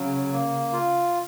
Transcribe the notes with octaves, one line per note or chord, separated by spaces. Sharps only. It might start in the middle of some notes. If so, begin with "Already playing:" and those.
Already playing: C#3 F#3
A#3
F4